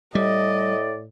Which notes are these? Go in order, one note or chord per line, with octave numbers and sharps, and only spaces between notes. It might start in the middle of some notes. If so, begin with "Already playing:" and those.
A2 G3 D5 D#5